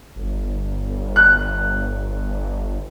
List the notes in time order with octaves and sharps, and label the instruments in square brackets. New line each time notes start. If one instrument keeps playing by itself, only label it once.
[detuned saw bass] G1
[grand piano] F#6